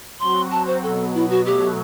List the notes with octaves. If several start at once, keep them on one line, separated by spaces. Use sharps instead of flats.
F#3 C4 F#4 C6
A5
C5
B2 F#3 B3 A4
E4
F#4
B2 F#3 A3 G4